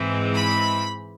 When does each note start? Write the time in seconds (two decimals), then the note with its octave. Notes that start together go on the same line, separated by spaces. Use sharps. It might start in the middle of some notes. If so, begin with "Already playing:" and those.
Already playing: G#2 E3 G#3 C4
0.35 B5